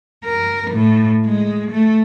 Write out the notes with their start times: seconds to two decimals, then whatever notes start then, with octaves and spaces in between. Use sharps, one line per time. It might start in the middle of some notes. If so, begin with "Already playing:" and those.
0.24 A#4
0.71 A2
1.25 G#3
1.71 A3